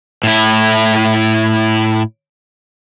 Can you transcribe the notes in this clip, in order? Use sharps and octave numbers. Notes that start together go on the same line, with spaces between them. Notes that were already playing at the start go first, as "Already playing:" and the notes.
A2 E4